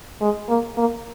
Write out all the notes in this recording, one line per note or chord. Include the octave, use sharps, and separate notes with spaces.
G#3
A#3
A#3